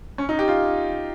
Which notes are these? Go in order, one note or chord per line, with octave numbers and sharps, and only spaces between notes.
C#4
D#4
G4
F4